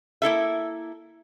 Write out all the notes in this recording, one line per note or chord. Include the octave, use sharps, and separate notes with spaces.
A#3 E4 A4 E5